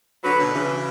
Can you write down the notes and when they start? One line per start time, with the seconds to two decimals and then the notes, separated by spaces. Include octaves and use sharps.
0.23 D3 F#3 B4
0.38 B2 D3
0.53 C#3 E3